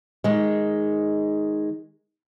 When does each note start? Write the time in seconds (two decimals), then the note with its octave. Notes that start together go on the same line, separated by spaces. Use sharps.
0.24 D#3 G#3